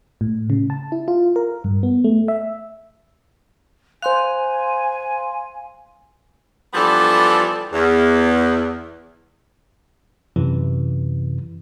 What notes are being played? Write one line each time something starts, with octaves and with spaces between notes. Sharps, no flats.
A2
C#3
A5
E4
F4
A#4
G2
B3
A3
E5
C5 F5 G#5 C6 F#6
E3 F3 G3 B3 D4 A4
E2
F#2 C3 E3